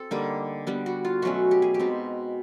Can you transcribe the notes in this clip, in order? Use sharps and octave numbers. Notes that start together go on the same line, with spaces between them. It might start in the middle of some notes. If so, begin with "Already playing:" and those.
Already playing: C4 A4
D3 G3 A#3 D#4
G3 B3 D4
F#4
F4
B2 F#3 A3 C#4 F#4
G4
G#4
G4
B2 G#3 C4 D#4